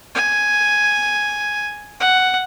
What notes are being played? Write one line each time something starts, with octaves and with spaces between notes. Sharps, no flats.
G#5
F#5